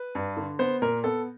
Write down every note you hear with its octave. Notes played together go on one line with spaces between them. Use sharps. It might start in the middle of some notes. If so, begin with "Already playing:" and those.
Already playing: B4
G2
D3
B3 C5
A#2 A#4
B3 A4